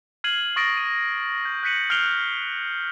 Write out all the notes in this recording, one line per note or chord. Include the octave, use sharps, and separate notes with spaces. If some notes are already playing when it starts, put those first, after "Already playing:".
F6 G#6 C7 D#7 F#7
C#6 D#6 A6 A#6 D7 F#7
D#7
G6
F#6 G6 B6 C#7 D#7 F#7
F6 G6 C7 D7 F7 G7